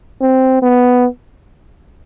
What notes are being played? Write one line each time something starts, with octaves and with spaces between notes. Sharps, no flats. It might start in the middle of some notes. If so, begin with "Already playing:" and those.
C4
B3